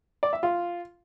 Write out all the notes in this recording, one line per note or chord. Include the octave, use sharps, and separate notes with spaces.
D5
E5
F4